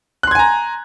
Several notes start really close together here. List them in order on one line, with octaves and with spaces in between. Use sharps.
F#6 C6 G#6 G#5 A#5